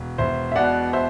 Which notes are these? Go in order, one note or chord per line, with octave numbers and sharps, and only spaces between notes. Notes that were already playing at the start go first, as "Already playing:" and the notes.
Already playing: E1
E1 C5 E5
E5
B2 D5 F#5
C5 E5